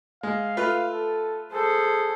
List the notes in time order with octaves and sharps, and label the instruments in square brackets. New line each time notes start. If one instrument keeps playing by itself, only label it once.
[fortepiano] G#3 [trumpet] F5
[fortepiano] A3 F4 B4
[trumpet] A4
[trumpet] G#4 [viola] A4 C5